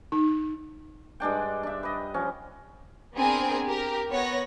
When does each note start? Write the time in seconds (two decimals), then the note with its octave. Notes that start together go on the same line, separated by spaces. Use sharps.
0.12 D#4
1.20 G2 G#3 D4 G5
1.63 D4 E5
1.83 B4 D#5
2.14 F3 C#4
3.15 B3 C4 D4 G#4 A#4 G#5
3.66 G4 A#4
4.10 B3 C#5 F#5 A#6